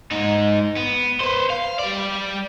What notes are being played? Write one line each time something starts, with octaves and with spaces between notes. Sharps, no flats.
G#2 D#4
B3
B4 C5
F5
G3 D5